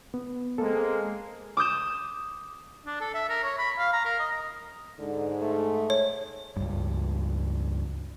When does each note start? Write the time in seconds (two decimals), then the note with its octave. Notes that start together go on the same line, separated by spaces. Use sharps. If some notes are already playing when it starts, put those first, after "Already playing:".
0.14 B3
0.58 G#3 A#3 C4 A4
1.57 D6 D#6 G6 E7
2.86 D4
3.01 A4
3.14 E5
3.29 A#4
3.44 C#5
3.58 B5
3.78 F5
3.93 A#5
4.05 A#4
4.20 D#5
4.99 G#2 D3
5.42 A3
5.90 C#5
6.56 C#2 G2